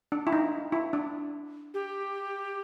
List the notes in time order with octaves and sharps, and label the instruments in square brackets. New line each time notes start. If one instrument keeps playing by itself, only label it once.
[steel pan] D4
E4
D#4
E4
D4
[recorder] G4